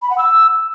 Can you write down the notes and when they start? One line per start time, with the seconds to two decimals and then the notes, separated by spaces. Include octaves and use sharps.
0.02 B5
0.10 F#5
0.18 E6